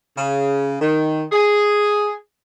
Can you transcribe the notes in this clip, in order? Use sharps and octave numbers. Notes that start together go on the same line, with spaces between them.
C#3
D#3
G#4